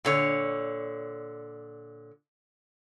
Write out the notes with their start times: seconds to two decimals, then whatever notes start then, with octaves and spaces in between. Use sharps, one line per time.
0.05 A#2 D3 C#5